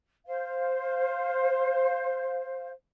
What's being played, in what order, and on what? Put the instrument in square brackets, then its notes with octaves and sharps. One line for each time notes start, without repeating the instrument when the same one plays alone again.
[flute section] C5 F5